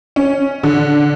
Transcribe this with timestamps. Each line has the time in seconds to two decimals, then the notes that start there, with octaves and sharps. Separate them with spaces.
0.16 C#4
0.63 D3